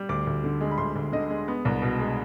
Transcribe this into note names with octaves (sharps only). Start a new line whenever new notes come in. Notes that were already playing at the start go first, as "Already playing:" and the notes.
Already playing: G3
D2 D6
D2
D3
G#3
B5
D2 C6
D2
D3 D#5
G#3
B3
C2
B2
G#3